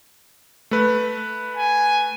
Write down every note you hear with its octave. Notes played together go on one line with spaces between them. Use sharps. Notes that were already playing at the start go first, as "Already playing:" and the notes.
A3 B4
G#5